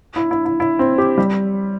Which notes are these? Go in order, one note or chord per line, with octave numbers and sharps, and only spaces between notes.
E4
E4
E4
E4
C4
G4
G3